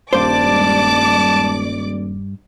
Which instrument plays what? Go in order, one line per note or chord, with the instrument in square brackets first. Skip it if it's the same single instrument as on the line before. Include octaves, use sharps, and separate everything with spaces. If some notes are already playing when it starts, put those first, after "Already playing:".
[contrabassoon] D#1 [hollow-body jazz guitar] G2 C5 [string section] G#3 D5 D6 [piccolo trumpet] A5